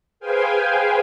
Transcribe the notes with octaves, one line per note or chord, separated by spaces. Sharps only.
G#4 B4 C5 F5 G5 G#5